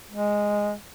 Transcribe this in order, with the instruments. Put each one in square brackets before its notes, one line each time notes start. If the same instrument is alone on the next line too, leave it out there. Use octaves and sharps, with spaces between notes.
[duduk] G#3